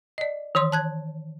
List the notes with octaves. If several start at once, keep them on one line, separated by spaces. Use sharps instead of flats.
D5 D#5
D#3 E3 C#5 C6 D#6
A5 F#6 G#6